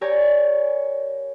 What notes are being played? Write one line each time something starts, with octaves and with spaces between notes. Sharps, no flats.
G4 A#4 C#5 D5 G#5 C#6